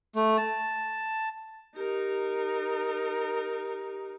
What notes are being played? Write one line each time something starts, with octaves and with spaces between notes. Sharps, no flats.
A3
A5
D#4 G4 A#4